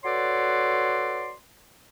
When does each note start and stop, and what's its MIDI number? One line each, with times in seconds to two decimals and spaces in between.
0.05 1.32 66
0.05 1.32 69
0.05 1.32 71
0.05 1.32 73
0.05 1.32 74
0.05 1.32 84